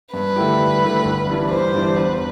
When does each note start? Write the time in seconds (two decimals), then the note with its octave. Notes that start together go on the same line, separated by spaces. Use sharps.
0.13 G2 B4
0.36 D3 A3 E4 G4
0.59 G2
0.82 D3 A3 E4 G4
1.05 G1
1.27 G2 E3 G3 D4
1.51 G1 C5
1.74 G2 E3 G3 D4
1.96 E2 B4